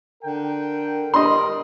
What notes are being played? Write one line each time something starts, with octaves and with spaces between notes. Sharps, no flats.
D3 A#4 G5
G3 A#4 D#5 C6